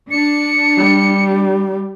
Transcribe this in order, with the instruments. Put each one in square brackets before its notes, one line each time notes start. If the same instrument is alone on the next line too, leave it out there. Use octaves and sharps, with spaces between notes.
[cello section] D4 [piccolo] C#7
[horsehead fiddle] G3